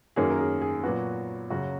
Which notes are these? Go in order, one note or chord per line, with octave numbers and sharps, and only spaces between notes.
F#2 D#3 A#3 C#4 G#4
A#4
G#4
G#4
A#2 F#3 B3 F#4
F#2 C#3 F#3 F#4